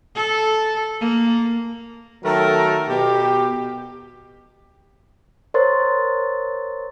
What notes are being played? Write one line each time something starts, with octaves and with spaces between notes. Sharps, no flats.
A4
A#3
D#3 F#3 A3 A4 A#4
B2 G4
A#4 C5 C#5 C6 A6